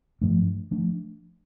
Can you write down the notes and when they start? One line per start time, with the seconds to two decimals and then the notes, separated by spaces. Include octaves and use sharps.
0.21 G2 F3 A3 D4
0.71 F3 A3 D4